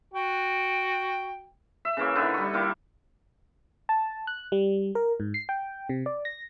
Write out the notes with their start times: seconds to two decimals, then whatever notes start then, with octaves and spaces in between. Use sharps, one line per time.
0.14 F#4 G5
1.85 E5
1.97 C#3 E3 A#3 C#5
2.15 D3 D#4 E4 B4
2.34 G3 C#6
2.53 D#3 A#3 E4 D6
3.89 A5
4.27 F#6
4.52 G3
4.95 A#4
5.20 G#2
5.34 C7
5.49 G5
5.89 C3
6.06 D5
6.25 A#6